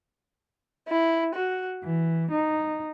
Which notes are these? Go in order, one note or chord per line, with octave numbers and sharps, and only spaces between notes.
E4
F#4
E3
D#4